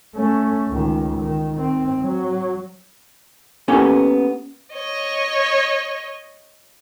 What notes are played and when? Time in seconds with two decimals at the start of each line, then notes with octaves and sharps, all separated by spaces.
0.15 A3 C#4
0.68 C#2 D#3
1.20 D#3
1.55 D#3 C4
2.01 F#3
3.68 A#3 B3 C#4 G4 A4
4.73 C#5 D#5